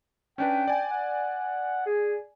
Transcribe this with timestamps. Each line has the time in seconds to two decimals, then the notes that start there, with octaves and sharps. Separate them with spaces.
0.38 C#4 D4 B4 G5
0.68 D5 G#5
0.91 F#5
1.86 G#4